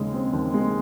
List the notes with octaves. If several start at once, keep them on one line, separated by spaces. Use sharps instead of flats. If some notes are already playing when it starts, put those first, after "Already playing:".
Already playing: D#2 C#3 G#3
C4
D#2
G#3